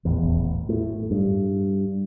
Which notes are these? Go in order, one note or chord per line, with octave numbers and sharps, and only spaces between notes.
D#1 A1 E2
A2
G2